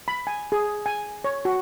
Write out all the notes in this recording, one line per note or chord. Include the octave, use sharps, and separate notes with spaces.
B5
G#5
G#4
G#5
C#5
F#4